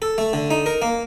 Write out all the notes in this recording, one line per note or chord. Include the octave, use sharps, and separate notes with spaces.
A4
A3
D3
D#4
A#4
A#3